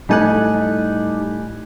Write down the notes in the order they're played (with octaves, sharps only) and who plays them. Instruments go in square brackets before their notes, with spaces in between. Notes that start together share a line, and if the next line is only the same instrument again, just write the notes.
[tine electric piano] A2 G#5 F#6 [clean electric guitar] G3 D#4 A4